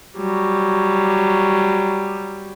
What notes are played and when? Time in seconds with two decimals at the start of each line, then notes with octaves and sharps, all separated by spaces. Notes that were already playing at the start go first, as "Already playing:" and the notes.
0.17 F#3 G3